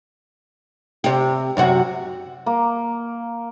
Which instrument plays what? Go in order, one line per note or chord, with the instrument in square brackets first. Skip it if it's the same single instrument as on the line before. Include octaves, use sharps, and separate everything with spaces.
[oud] C3 G4
F#2 C3 F#4
[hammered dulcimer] A#3